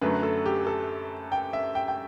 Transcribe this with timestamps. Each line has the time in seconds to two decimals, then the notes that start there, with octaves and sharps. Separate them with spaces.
0.01 F#2 D3 F#3 A3 B4
0.23 A4
0.46 G4
0.67 A4
1.32 G5
1.53 E5
1.75 G5
1.88 G5